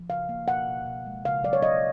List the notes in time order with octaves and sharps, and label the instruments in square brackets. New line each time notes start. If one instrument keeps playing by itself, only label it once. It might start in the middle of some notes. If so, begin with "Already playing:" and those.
Already playing: [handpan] F3
C#3 F5
A#3
B2 F#5
B2
B2
G#3
C#3 F5
F#3 D5
C#5
F#3 D#5